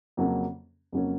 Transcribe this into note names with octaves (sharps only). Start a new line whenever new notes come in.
F2 C#3 F#3 A#3 C#4
F2 C#3 F#3 A#3 C#4